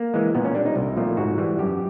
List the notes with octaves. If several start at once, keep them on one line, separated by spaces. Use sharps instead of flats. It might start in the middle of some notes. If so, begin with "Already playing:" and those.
Already playing: A#3
E3 G#3
A#2 B3
C#4
G3 D4
D#4
C2
A#2 F3 A3
G#2 F#4
E3 G3
F#2 G4